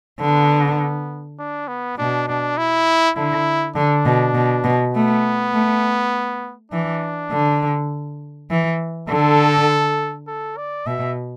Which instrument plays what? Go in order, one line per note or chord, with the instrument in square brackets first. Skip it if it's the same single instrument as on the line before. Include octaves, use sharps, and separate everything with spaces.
[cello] D3 [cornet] B3
[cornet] D4
B3
[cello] B2 [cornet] D4
[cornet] D4
E4
[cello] D3 [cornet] E4
[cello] D3 [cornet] D4
[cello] B2
B2
B2
[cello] A3 [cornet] B3
[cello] A3
[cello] E3 [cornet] D4
[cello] D3
E3
[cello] D3 [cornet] A4
[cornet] A4
D5
[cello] B2 [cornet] E5